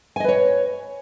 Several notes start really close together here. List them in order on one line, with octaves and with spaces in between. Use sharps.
G#5 D#5 B4 C#5